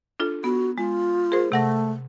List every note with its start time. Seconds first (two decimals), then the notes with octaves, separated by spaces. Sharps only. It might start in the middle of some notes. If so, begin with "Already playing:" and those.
0.20 D4 F4 A4
0.44 B3 F#4
0.78 G#3 F4
1.32 G#4 A#4 C5
1.52 C3 A3 F#5 A#6